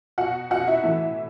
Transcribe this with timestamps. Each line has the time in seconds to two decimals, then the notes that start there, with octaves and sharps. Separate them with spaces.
0.18 B2 F#4 F#5
0.50 B2 F#4 F#5
0.67 E4 E5
0.83 A2 E3